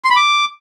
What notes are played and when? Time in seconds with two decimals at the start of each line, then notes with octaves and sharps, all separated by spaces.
0.04 C6
0.10 B5
0.16 D6